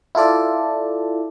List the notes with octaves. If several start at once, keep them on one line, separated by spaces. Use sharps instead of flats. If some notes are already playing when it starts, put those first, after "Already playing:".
E4 F4 A4 D5